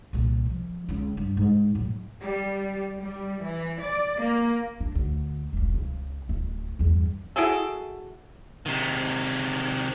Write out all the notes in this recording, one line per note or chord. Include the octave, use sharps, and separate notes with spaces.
C2 A#2
F3
C#2 E4
G2
G#2
A2 F#3
G3
G3
E3
D5
A#3
D4
D2
E1 C#2
C#2
D1
E2 G2
E4 F#4 G#4 A4
C3 D#3